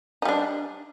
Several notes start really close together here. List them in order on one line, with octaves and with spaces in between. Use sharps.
D#4 G3 D4